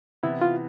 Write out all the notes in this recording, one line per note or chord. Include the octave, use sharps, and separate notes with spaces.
C3 E3 B3 E4
F4